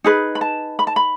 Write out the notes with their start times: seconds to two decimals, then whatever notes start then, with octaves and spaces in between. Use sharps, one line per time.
0.04 D#4 G#4 B4
0.35 B5
0.41 A5
0.79 B5
0.87 A5
0.96 B5